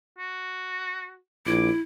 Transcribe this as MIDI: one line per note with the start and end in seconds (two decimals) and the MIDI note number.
0.18 1.17 66
1.46 1.69 34
1.46 1.81 64
1.46 1.69 86